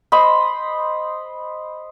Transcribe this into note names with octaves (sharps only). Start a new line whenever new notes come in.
C5 D#5 B5 C6